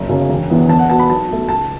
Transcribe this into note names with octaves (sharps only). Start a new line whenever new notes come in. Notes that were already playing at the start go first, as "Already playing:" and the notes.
Already playing: F#1
F#2 C#3
E1
E2 E3 B3
E2 A5
F#5
B2 B3 A5
B5
B1 A5
B2 A3
C#2 A5